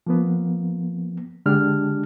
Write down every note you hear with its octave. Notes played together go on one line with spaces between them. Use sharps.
F3 A#3 B3
D3 G#3 D4 G4 F6